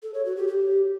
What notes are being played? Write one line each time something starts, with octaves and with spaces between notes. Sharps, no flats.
A4
C#5
F#4
G4
G4